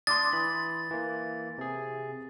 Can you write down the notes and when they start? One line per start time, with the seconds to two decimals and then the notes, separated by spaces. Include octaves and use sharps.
0.07 D4 C6 D6 D#6 A6
0.33 E3 B5
0.91 E3 A#3
1.58 C3 G#4